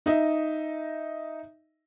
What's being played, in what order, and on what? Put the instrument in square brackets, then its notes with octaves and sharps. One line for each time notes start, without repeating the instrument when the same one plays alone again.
[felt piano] D#4 D#5 E5